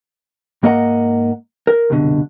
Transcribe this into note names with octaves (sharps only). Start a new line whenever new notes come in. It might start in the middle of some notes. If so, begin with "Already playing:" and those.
G#2 A#3 A#4 D#5 F#5 A#5
A#4
C2 F#2 B2 D3